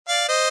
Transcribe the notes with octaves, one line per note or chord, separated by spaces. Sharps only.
D5 F5
C5 D#5